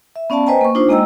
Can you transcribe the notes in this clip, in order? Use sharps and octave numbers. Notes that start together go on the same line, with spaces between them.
E5
B3 C#4 D5 F5 A5
B4 C5 D#5 G5 G#5 A#5
A#3 C#6
D4 D#4 F4 C5
G#3 A#3 D#5 G5 A#5 E6